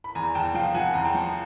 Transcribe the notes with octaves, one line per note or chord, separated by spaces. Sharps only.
B5
E2 G#5 A#5
E2 G5 A5
F3 F5 G5
F3 F#5 G#5
E2 A#5
G5 A5
F3